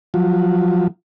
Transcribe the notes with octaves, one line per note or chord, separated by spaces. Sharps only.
F3 F#3